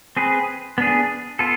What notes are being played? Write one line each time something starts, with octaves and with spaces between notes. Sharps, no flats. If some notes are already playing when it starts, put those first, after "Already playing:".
C4 G#4 B4
B3 D4 G#4
B3 F4 A4